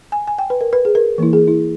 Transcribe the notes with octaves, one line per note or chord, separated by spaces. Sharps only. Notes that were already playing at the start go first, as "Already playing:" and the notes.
G#5
G#5
G5
B4
A#4
B4
G#4
A#4
E3 A#3 E4
G#4
E4